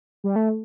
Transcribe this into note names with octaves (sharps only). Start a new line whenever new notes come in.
G3
A3